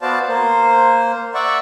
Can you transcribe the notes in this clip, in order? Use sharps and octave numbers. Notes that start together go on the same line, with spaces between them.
B3 F#4 C5 D5 F5 A5
A#3 C5
D5 E5 F#5 C#6